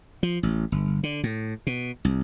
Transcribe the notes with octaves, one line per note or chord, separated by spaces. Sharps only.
F3
A1
G1
D3
A2
B2
C2